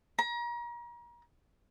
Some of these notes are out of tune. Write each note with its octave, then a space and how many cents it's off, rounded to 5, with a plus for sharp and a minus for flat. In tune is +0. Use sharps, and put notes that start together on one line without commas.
A#5 +35